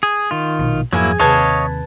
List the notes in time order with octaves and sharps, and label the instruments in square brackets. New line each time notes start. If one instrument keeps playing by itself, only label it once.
[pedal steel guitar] G#4
D#3 F4
[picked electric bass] A#1 B2
[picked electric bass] F2 G#2 F3 [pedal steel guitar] F#3 A#3 E4 [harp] G#4 G#6
[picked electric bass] D#2 C3 [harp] B4 A5 G#6 [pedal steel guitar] C#5 D#5 F5